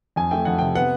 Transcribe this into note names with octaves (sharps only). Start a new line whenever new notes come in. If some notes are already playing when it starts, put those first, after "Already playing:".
F2 G#5
A3 G5
F2 F#5
C3 G5
B3 F#5